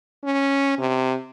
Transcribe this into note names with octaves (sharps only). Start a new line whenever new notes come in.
C#4
C3